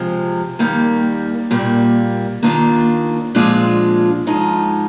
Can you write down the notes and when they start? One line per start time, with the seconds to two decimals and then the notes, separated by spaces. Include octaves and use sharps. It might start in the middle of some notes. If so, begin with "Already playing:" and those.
Already playing: C3 F3 G#3
0.59 D#2 D#3 G3 A#3
1.51 A#2 G3 A#3
2.43 D#2 D#3 A#3 D4 F4
3.35 A#2 F3 G#3 D4 F4
4.27 G#2 F3 G#3 D#4